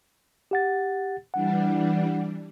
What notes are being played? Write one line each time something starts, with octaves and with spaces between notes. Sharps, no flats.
G4 F#5 A6
E3 G3 D4 F#5